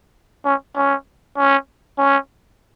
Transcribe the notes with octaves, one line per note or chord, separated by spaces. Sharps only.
C#4
C#4
C#4
C#4